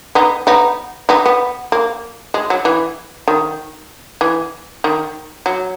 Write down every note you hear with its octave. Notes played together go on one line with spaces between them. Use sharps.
B3 D#4
B3 D#4
B3 D#4
B3
A#3
G#3
F#3
E3
D#3
E3
D#3
F#3